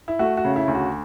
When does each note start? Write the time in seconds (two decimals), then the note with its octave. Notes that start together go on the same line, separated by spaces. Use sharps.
0.08 E4
0.19 A3 F#4
0.37 F#4
0.45 C#3
0.56 E4
0.68 D2
0.75 F#4